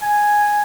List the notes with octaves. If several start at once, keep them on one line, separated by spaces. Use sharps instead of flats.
G#5